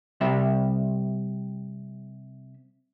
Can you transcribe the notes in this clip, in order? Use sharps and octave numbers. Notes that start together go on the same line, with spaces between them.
C3 G3 E5